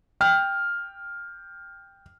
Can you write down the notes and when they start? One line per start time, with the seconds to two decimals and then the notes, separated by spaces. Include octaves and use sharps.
0.21 G5 F6